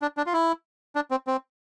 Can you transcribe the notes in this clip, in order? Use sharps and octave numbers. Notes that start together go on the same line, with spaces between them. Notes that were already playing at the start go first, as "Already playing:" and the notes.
D4
D4
F4
E4
D4
C4
C4